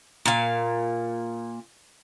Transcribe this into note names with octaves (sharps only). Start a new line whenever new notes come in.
A#2 F5